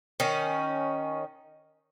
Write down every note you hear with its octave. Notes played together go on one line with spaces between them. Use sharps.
D#3 C#4